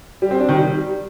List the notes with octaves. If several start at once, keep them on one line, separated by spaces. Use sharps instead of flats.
G3
C4
D4
D#3
G3